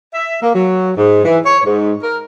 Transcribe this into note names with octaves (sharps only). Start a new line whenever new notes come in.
E5
A#3
F#3
G#2
E3
C#5
G#2
A#4